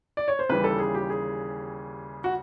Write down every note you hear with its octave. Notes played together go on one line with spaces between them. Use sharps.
D5
C#5
C5
D#2 C#3 E3 G3 B4
A4
G#4
G4
G#4
F#4